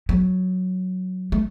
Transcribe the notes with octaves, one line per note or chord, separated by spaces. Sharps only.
F#3
A3